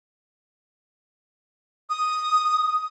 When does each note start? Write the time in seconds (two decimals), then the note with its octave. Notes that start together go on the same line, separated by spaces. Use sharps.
1.90 D#6